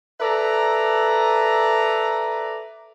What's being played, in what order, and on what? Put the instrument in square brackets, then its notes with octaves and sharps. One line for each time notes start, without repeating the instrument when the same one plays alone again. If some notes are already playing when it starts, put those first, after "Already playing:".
[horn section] A4 B4 D5 E5 A#5